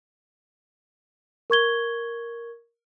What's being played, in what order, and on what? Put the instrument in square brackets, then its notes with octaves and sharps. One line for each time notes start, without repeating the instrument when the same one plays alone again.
[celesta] A#4 C#6 G#6 G7